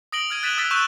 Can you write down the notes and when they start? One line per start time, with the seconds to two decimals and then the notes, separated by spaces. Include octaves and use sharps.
0.12 D#6 A#6 D7 F#7 G7
0.30 F6 G#6 D#7
0.43 F#6 A6 B6 D#7 E7 F#7
0.58 D#6 E6 F#6 A6 B6 G7
0.71 C#6 E6 F#6 G6 D#7 E7